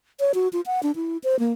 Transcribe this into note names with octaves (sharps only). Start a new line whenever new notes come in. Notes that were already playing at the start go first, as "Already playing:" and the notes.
C#5
F#4
F4
F#5
D4
E4
C5
A#3